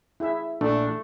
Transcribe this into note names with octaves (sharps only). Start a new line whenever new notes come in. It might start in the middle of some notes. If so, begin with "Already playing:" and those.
E4 G#4 E5
A#1 A3 D4 A4